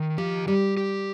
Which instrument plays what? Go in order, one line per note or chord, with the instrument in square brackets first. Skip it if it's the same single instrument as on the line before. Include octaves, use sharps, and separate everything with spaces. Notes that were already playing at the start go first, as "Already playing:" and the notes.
Already playing: [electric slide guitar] D#3
[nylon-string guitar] F3 [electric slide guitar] G4
[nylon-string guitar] G3 [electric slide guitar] G4
[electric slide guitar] G4